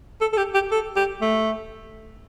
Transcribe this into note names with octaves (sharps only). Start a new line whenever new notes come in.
A4
A4
G4
G4
A4
G4
A3